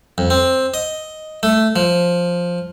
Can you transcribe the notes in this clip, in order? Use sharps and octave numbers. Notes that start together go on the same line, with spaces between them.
F2
C4
D#5
A3
F3